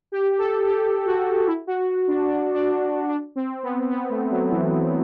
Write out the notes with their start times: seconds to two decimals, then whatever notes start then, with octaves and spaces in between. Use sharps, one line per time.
0.12 G4
0.39 A4
0.66 G4
1.06 F#4
1.47 E4
1.67 F#4
2.08 D4
2.28 D4
2.54 D4
3.08 D4
3.36 C4
3.63 B3
3.89 B3
4.10 A3
4.30 F#3
4.50 E3